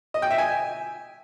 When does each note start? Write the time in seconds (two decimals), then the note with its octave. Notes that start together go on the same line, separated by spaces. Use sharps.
0.14 D#5
0.22 G5
0.30 E5
0.38 G#5